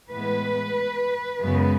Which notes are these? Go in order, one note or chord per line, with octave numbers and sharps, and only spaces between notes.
A2 E3 G#3 B3 B4
F#2 C#3 G#3 B3